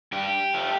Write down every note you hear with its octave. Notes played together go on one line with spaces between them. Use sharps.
G2 G4
F3 A3